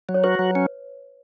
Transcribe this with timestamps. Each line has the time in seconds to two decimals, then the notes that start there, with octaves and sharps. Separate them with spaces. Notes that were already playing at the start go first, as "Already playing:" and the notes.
0.09 F#3
0.14 C#5
0.24 F#4 B4
0.39 F#3
0.55 C#4